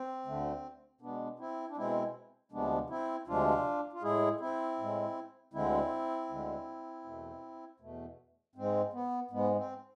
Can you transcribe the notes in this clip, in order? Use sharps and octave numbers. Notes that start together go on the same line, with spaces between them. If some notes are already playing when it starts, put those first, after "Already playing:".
Already playing: C4
D2 D3 A3
B2 G#3 B3 D4
C4 E4
D4
B2 G#3 C4 E4
D2 C3 F3 G#3 B3 D4
C4 E4
D2 C3 F3 G#3 D4 F4
F4
A2 G#3 E4 G#4
C4 E4
A2 G#3
D2 D3 G#3 C4 E4
D2 D3 G#3
E2 B2 A3
E2 B2 A3
G#2 G#3 C4
B3
G#2 G#3 B3
C4